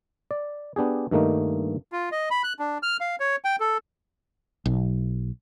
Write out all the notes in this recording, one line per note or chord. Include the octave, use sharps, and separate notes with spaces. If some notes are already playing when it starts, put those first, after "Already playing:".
D5
B3 D4 G4 G#4
G2 D#3 A3 A#3 D#4
F4
D#5
B5
F#6
D4
F6
F5
C#5
G5
A4
B1